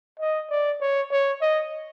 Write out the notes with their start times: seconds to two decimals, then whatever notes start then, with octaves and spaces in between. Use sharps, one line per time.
0.20 D#5
0.51 D5
0.81 C#5
1.11 C#5
1.41 D#5